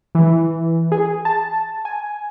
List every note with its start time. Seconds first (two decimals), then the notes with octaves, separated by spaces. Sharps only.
0.15 E3
0.92 G#4
1.25 A5
1.85 G#5